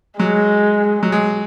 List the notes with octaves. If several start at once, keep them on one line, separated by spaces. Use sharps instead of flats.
F#3 G#3
F#3
G#3